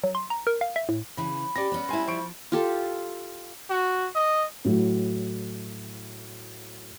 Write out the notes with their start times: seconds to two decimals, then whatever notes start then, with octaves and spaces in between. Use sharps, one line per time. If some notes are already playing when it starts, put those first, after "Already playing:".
0.04 F#3
0.15 C6
0.30 A#5
0.47 A#4
0.61 F5
0.76 E5
0.89 A2
1.17 C#3 E3 B5
1.56 C#4 G4 D5 A#6
1.72 B3 C#4
1.89 G3 E4 G#5 C6
2.08 F3 C5 C#6 D7
2.52 F4 G4 A4
3.70 F#4
4.15 D#5
4.65 A2 F#3